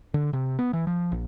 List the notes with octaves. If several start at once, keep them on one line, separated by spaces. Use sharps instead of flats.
D3
C3
B3
E3
F3
A#1